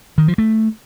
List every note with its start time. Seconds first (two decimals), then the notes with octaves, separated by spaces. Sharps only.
0.18 D#3
0.28 F3
0.38 A3